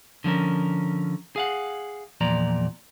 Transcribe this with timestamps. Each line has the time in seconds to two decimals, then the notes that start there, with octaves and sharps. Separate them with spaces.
0.24 D3 F3 C#4 A#4
1.36 G#4 F5 F#5
2.21 E2 A#2 F3 D5 A#5